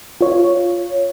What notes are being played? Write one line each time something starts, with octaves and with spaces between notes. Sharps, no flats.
F4 C#5